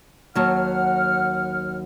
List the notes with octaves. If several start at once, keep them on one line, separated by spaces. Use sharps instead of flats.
D#2 F#3 F#5 A5 F6